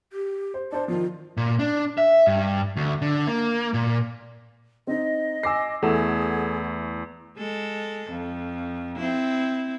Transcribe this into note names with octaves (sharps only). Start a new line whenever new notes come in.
G4
C5
D4 C5 A5
D#3 F3 F4
A#2
D4
E5
G2
D2
D3
A#3
A#2
C4 D#4 D#5
G#5 D6 E6 A#6 C7
E2 A3 E4 G#4 A4 F#5 E7
G#3 A4
F2
C4 E4